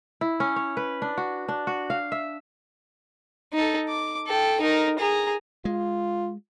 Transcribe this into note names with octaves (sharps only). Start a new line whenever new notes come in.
E4
C#4
C#5
B4
D4
F#4
D4
F#4
F5
E5
D#4 A4
D6
A4 G5
D#4 A#4
G#4 A#5
G#3 F4